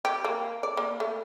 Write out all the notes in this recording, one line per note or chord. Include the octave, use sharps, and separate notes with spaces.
G4
A#3
D5
A#3
A3